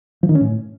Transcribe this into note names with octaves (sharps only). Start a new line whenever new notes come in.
F3
D#3
C#4
A2